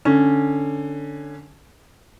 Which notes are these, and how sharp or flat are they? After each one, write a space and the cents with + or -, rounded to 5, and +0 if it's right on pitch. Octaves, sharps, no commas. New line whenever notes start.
D3 +5 C#4 +0